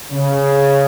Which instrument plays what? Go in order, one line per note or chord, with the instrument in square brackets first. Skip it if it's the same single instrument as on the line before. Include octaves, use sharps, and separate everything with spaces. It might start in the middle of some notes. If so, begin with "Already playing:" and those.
[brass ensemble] C#3